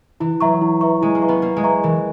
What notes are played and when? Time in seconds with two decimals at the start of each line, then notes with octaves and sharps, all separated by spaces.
0.20 E3 E4
0.41 F#3 B4 E5 A#5 C#6
0.61 E4
0.81 B4 E5 A#5 C#6
1.01 G#3 E4
1.15 A#3
1.22 B4 E5 A#5 C#6
1.29 B3
1.42 A#3 E4
1.57 G#3
1.63 B4 E5 A#5 C#6
1.83 E3 A#4